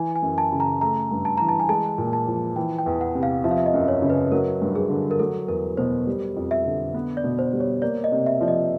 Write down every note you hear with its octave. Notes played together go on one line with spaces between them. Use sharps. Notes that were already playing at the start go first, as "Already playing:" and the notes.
Already playing: E3 G#5
G#5
F#2
A5
C#3
A#5
A3 A#5
G2
A5
E3 A#5
A5
G#5
G#3 A5
A#2
A5
F3
E3 G5
G5
E2
F#5
C3
F5
F3 E5
F5
E5
D#5
F#2
C#5
C#3
B4
F#3 A#4
G2
G#4
D3
A#4
F#3 A4
E2 A#4
B2 C5
G3
F2
E5
D3
B3
D5
B2
C5
G3
C#5
A#3 D5
D#5
C3
E5
F3 D5
D#5